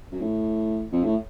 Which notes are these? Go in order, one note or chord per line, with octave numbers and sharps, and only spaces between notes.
F#2
A2
F2
A2